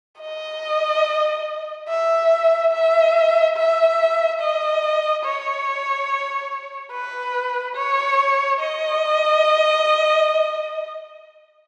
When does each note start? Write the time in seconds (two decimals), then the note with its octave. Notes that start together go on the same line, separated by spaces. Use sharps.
0.20 D#5
1.89 E5
2.72 E5
3.56 E5
4.40 D#5
5.25 C#5
6.92 B4
7.76 C#5
8.60 D#5